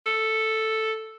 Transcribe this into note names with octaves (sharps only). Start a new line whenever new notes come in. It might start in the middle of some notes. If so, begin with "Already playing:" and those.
A4